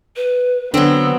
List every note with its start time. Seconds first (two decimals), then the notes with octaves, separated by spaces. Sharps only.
0.16 B4
0.74 D3 F#3 B3 C4 E6